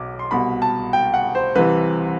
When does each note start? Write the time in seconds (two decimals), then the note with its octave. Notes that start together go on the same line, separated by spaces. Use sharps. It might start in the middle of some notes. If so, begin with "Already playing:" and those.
Already playing: B1 B2 D6
0.19 C6
0.31 C2 B2 B5
0.62 A5
0.93 G5
1.14 F#5
1.35 C5
1.55 C2 C3 E3 B4